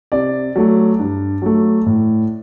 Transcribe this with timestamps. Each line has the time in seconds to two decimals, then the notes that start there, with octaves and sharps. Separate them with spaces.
0.12 C3 D5
0.56 F#3 A3
0.99 G2
1.42 F#3 A3
1.86 A2